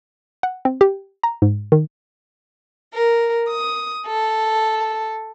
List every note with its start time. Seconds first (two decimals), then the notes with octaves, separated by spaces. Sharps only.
0.43 F#5
0.65 C4
0.81 G4
1.24 A#5
1.42 G#2
1.72 D#3
2.94 A#4
3.51 D#6
4.06 A4